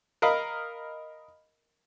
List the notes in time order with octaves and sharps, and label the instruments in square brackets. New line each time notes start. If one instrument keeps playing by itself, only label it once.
[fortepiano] A#4 D#5 F5 B5